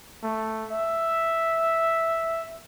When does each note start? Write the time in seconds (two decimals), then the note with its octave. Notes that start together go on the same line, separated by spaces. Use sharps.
0.24 A3
0.72 E5